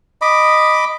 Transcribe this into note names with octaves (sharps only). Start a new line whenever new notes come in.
D#5 B5 D6